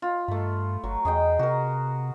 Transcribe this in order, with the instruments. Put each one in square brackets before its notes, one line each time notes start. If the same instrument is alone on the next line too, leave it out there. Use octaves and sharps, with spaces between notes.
[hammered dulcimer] F4
[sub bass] G2 [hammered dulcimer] A3 B5
[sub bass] G1 [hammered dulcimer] F#3
[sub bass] E2 [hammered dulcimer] G#4 D#5 G5
[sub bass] C3 [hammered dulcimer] F#4 A#4